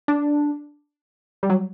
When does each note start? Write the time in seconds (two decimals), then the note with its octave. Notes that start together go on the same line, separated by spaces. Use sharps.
0.08 D4
1.43 G3
1.50 F#3